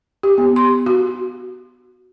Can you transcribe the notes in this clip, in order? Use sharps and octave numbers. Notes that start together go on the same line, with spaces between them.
G4
B3
C6
F#4